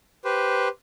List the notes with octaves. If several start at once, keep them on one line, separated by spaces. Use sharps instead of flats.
G4 B4 C5